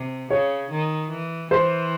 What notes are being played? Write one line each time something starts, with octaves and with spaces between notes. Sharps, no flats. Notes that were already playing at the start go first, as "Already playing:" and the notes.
Already playing: C3
C#3 C#5
D#3
E3
E3 C5